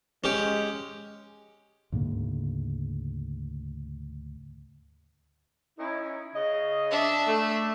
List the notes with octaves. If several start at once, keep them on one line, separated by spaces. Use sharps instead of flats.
G#3 C#4 G4
D2 G#2 C#3 A#3
C#4 D#4 E4
C#3 D#5
D4 E5
A3